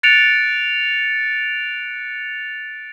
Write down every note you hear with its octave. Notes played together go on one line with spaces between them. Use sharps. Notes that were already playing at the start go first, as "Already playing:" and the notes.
F#6 A6 C#7 D7 F7